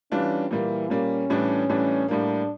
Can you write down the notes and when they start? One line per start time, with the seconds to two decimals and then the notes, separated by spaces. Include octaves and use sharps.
0.11 E3 G3 C#4 D4 F4
0.51 A#2 E3 G3 A#3
0.90 A#2 G3 A#3 C#4
1.30 A2 E3 G3 D4
1.70 A2 E3 G3 D4
2.08 A2 G3 A#3 D4